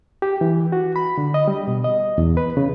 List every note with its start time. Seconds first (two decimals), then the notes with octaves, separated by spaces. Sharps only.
0.22 G4
0.41 E3
0.72 F#4
0.96 B5
1.18 D3
1.34 D#5
1.48 G3
1.68 B2
1.84 D#5
2.18 E2
2.37 B4
2.57 C#3